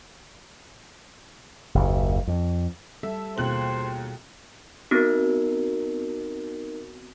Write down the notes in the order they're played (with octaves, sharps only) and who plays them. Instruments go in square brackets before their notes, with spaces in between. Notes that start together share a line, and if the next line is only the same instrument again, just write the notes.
[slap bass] F#1 D#2
F2
[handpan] G3 A4 [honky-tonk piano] E5
[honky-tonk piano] D#2 F#6 F#7 [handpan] B2 F4 G#4 [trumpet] C5
[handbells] B3 C4 F#4 [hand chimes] D#4 A#4